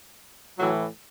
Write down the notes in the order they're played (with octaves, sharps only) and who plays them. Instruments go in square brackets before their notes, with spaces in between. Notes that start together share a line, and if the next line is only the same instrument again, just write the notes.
[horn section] A2 E3 F#3